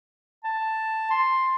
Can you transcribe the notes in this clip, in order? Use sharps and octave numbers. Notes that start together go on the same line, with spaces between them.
A5
C6